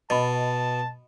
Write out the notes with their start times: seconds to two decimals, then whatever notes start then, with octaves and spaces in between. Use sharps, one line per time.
0.10 B2 D#5 A5 B5